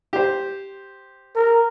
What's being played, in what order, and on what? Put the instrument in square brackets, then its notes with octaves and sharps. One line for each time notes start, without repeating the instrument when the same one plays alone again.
[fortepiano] G4 C5
[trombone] A#4